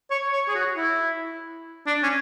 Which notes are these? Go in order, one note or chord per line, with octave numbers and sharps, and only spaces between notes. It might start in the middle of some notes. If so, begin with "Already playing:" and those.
C#5
C#5
G#4
F#4
E4
D4
C#4